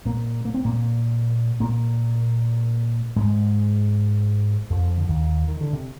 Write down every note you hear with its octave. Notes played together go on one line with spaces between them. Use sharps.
A#2 A#3
A#3
C4
A#2 A#3
A#2 A#3
G#2 G#3
F2 F3
D3
D#2 D#3
D#3
D3
C3